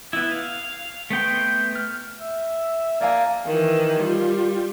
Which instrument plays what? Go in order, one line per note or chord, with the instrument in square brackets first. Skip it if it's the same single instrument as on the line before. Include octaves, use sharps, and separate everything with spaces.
[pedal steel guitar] B3 E4
F5
A3 B3 G5 C6
F6
[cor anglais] E5
[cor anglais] A#3 [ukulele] D5 F5 G#5
[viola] D#3 E3
G3 F4